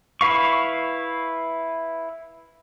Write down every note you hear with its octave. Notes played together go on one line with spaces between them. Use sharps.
E4 B4 F5 C#6